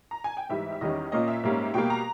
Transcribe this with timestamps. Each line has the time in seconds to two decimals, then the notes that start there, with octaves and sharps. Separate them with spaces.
0.11 A#5
0.24 G#5
0.37 G5
0.49 G#2 E3 G3 E5
0.72 E5
0.81 E2 D#3 G3 C#4 D#5
1.12 A#2 A#3 C#4 D#5
1.28 E5
1.43 G#2 G3 A#3 C#4
1.74 B2 G3 A#3 G5
1.90 A#5